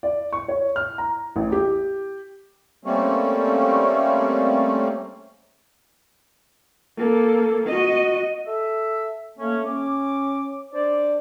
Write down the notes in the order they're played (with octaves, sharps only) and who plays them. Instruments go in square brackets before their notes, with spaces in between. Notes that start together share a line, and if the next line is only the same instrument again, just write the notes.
[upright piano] D5
C#6
C#5
F6
A#5
A1
G4
[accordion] G3 A3 A#3 C4 C#4
[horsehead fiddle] A#3 A4
F#4 D#5
[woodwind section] A4 E5
A3 A#3 C#4
C#4 D6
D4 C5 D5